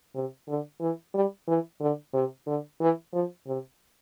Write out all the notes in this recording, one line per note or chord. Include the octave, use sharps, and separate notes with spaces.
C3
D3
E3
G3
E3
D3
C3
D3
E3
F3
C3